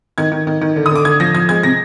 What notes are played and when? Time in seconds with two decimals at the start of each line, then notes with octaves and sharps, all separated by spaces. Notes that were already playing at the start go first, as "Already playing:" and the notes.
0.18 D#3 G#6
0.32 D#3
0.47 D#3
0.61 D#3
0.76 D3
0.86 D#6
0.91 D3 D6
1.05 D3 G#6
1.20 F3 A#6
1.34 F3 G#6
1.49 G#3 G#6
1.63 C3 A#6